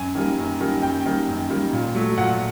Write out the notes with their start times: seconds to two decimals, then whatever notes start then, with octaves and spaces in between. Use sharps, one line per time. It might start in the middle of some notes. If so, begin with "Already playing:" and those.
Already playing: F#2 G#5
0.15 D#3 G3 A#3
0.38 F#2
0.60 D#3 G3 A#3
0.82 F#2 G5
1.05 D#3 G3 A#3
1.28 F#2
1.50 D#3 G3 A#3
1.73 A#2
1.95 F#3 A3
2.18 A#2 F#5